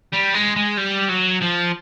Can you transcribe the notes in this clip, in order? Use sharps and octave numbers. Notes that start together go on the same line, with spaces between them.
G3
G#3
G#3
G3
F#3
F3